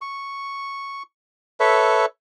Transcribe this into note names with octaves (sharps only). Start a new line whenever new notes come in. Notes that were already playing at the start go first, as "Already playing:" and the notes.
C#6
A4 B4 C#5 E5